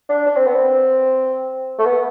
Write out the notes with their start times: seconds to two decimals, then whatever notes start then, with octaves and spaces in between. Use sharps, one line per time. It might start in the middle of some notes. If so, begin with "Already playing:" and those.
0.09 D4
0.26 D4
0.36 C4
0.47 B3
0.56 C4
1.79 A3
1.86 B3